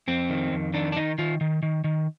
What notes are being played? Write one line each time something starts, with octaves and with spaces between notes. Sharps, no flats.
F2 C4
D#3
F2
D#3 D4
D4
D#3 D#4
D#3 F4
D#3
D#3
D#3